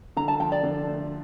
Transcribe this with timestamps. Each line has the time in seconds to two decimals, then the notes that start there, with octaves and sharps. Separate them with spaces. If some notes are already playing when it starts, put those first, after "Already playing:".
0.16 D3 A#5
0.28 A5
0.40 F3 G5
0.52 D5
0.63 D3
0.87 A3